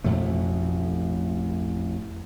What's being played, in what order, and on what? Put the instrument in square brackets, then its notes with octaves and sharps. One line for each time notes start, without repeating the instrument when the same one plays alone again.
[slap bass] A1 F2 B2 A3